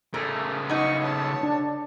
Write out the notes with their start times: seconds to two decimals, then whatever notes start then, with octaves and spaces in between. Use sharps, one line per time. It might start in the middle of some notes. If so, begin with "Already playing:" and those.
0.14 C#3 A3 A#4
0.69 B3 D#4 F#4 C#6
1.03 C#5 A5
1.43 D4